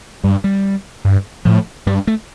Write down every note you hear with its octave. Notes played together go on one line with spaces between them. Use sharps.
G2 G3
G3
G2
A2 F3
G2 G3
A3